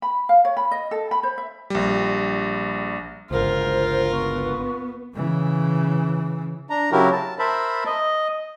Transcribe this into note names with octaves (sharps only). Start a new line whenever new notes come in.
B5
F5
C#5
B5
D#5
A4
B5
C5
E5
A#1 G3
G1 C#2 F4 A#4 C5
B3 C#6
C#3 E3
D4 A#5
C#3 F#3 E4 F#4 G4 A#4
A5
A#4 C5 E5 A5 B5
D#5